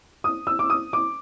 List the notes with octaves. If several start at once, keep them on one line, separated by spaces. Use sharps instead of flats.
D#6
E6
D6
D#6
D6